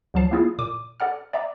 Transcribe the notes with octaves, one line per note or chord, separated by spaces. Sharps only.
D2 F3 F#3 A5 C7
A#3 B3 E4 F4 G#4
A#2 D6 D#7
A4 D5 F#5 F6
D5 E5 A#5 D6